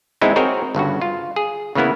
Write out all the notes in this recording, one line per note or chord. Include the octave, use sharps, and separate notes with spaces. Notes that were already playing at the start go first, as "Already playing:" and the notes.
E3 G#3 B3 C4 D#4 E4
C4 F#4 G#4 A#4 C#5 D#5
G1 G2 C#3 F#4
F4
G#4
C#3 E3 A#3 B3 E4